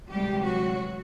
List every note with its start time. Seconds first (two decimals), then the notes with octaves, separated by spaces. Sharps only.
0.10 D2 C3 E3 G3 G#3 G4
0.44 F#3 F#4